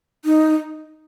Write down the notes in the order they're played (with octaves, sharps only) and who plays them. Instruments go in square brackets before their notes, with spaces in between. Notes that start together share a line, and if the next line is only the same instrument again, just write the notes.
[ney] D#4